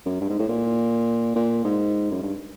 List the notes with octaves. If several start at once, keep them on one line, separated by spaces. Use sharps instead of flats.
F#2
G2
G#2
A2
A#2
A#2
G#2
F#2
G2